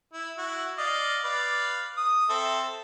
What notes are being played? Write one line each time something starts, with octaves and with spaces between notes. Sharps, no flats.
E4
E4 F#4
D5 D#5 F5
B4 D5 F5
D#6
C4 A4 E5